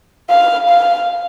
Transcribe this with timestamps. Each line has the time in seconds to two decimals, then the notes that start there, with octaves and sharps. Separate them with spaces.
0.30 F5
0.69 F5